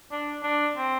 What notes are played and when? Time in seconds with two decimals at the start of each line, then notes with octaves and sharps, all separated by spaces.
0.11 D4
0.43 D4
0.76 C4